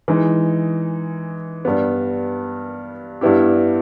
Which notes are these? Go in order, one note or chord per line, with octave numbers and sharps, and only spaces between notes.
E3 G#3 D#4
G2 G3 B3
G2 G3 B3 E4 G4